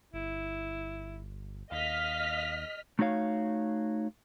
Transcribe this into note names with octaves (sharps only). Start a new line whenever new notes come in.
G1 E4
D#2 D#5 F5 F6 B6
A3 D#4 F#4 C#5 F5